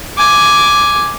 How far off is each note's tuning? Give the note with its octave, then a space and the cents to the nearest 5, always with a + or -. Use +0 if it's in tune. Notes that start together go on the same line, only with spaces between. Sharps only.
G#5 +5 D6 +0